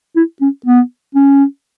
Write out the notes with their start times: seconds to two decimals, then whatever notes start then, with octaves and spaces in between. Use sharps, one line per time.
0.16 E4
0.41 C#4
0.66 B3
1.15 C#4